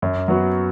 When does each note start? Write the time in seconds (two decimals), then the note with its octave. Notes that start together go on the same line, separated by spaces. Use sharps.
0.02 F#2
0.28 F#3 B3 F#4